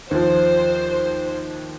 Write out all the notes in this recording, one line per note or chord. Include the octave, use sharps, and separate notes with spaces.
D#2 F3 C5